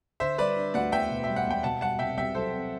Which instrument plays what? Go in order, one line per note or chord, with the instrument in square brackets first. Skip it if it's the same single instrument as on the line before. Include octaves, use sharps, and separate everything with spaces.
[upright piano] D3 [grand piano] C5 E5
[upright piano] G3 [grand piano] B4 D5
[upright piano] D4
[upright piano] D2 [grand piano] D5 F#5
[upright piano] E2 [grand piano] E5 G5
[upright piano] B2
[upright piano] G3 [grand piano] E5
[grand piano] F#5
[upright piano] E1 [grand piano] G5
[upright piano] B2 [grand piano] F#5 A5
[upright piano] G3 [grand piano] F#5 A5
[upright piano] C2 [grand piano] E5 G5
[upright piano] C2 [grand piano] E5 G5
[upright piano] F#3 [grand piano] A4 C5
[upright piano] C4